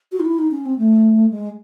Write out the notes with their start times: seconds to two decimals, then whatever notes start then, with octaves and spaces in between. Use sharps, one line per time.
0.12 F#4
0.20 D#4
0.25 E4
0.38 D#4
0.51 C#4
0.66 C4
0.78 A3
1.31 G#3